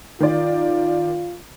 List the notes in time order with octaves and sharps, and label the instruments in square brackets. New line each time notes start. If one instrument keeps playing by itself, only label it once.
[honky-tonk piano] D#3 D5 [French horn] F4